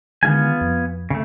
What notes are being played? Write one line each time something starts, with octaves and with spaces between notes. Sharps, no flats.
D3 D#3 G#3 B3 F4 G#5
F2
C#3 A3